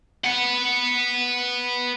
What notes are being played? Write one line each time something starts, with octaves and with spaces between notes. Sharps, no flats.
B4 F#5